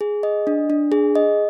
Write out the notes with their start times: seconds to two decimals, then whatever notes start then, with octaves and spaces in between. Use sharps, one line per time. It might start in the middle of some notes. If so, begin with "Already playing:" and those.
0.01 G#4
0.23 D#5
0.47 D4
0.70 D4
0.92 G#4
1.15 D#5